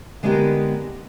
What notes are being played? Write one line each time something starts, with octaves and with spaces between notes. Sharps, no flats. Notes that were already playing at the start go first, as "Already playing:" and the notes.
D3 G#3 B3 D#4 G4 A#4